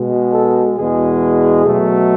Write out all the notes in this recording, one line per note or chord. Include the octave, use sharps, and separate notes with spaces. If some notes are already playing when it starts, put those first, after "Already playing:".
Already playing: B2 G#3
A4
E2 B2 G#3 G#4
B2 F#3 A3